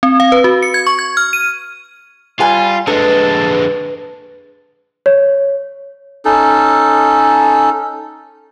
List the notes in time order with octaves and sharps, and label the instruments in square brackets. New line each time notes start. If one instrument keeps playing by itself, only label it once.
[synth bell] C4
F5
B4
F#4
C#7
G#6
C#6
G#6
F6
D#7
[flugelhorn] G3 [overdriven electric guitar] F4 [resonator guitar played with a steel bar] B4 G#5
[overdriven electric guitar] D3 G#3 [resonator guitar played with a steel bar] A4 [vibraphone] B4 [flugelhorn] A5
[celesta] C#5
[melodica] C#4 D#4 A4